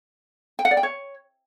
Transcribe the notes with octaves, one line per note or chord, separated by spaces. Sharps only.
G5
F#5
D5
G5
C#5